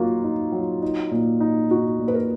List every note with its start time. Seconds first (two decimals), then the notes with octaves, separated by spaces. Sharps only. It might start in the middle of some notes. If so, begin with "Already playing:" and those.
Already playing: A#2 F#3 A#3 D#4 F4 F#4
0.24 D#4
0.52 F#3
0.82 D#4
1.11 A#2
1.40 D#4
1.71 D#4 F#4
2.00 A#2
2.08 B4
2.14 A#4